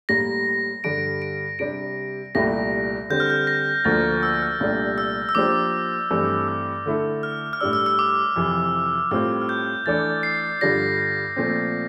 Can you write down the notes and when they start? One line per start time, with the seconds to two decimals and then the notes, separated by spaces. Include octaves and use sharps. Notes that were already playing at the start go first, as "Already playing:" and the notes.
0.09 A2 G3 A#3 A#6
0.84 G2 D3 G3 D7
1.22 D7
1.59 C3 G3 D4 D7
2.35 C2 A#2 A3 E4 G4 A#6
3.10 D3 G3 C4 G6
3.20 F6
3.30 G6
3.47 A#6
3.84 D2 D3 F3 A#3 A6
4.23 E6
4.42 F6
4.60 C2 A#2 A3 D4 G4
4.98 E6
5.29 E6
5.35 F3 A#3 D4 G4 C5 D6
6.10 G2 E3 A3 C4 G4
6.48 E6
6.86 D3 A3 E4 A4
7.23 F6
7.53 F6
7.61 A2 G3 D4 E6
7.73 E6
7.86 E6
7.99 D6
8.36 F2 C3 E3
9.11 A2 G3 C4 F4 E6
9.41 F6
9.49 G6
9.86 E3 A3 D4 A4 D5 A6
10.23 C7
10.61 G2 D3 G3 D4 F4 A#6
11.37 A#2 F3 A3 C4